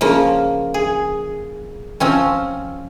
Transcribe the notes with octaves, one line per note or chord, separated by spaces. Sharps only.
C#3 F3 A#3
G#4
F3 C4 C#4